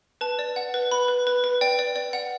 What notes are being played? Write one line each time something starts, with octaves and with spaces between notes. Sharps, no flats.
B4 A5
D5
F#5
B4
B4 B5
B4
B4
B4
D5 G5
D5
D5
F#5